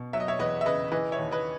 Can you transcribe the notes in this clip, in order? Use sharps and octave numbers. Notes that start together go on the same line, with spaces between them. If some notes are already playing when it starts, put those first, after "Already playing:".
Already playing: B2
F#3 E5
D#5
C#5 E5
E2 B4 D#5
E5
C#3 B4 D#5
E3 B4 D#5
C#5 E5
D#2
B4 D#5